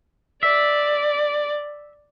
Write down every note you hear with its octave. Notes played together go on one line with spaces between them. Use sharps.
D5 E5